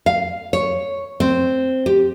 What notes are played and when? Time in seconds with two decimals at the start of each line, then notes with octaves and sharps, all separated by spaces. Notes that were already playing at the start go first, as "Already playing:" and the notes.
0.06 F5
0.53 C#5
1.20 C4
1.86 G4